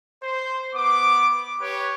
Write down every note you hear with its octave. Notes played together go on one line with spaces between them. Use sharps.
C5
B3 D6
G4 B4 C#5